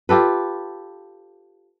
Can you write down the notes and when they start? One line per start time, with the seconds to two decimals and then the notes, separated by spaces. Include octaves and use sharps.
0.09 F4 G4 A4 B4